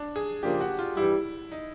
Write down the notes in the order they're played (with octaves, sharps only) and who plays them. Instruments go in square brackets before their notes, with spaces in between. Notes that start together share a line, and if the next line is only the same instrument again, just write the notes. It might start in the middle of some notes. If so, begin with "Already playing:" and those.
Already playing: [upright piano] D4
G#4
[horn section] C#3 F3 A#3 D4 F4 [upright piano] G4
[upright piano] F#4
F4
[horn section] G2 E3 G3 [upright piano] E4
[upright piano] D#4